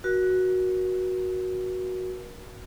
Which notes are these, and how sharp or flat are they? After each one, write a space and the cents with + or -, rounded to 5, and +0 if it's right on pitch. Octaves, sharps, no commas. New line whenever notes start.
F#4 +0 A#4 +40